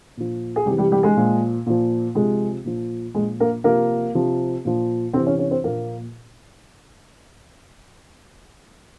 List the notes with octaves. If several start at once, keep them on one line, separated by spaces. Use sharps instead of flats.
A#2 F3
G#4
C3 E3 G3 G4
G3 G4
G3 G4
G#3 G#4
A#2 F3
A#2 F3
C3 F3 G#3 G#4
A#2 F3
A#2 F3 G#3 G#4
A#3 A#4
C3 F3 A#3 A#4
C3 F3
A#2 F3
C3 E3 C4 C5
C#4 C#5
C#4 C#5
C4 C5
A#2 F3 A#3 A#4